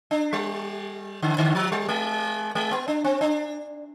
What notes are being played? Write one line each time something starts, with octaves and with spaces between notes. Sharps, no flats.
D4
G3
D3
D3
F3
G3
G#3
G#3
B3
D4
C4
D4